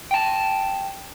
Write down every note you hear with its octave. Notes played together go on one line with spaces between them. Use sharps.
G5 A5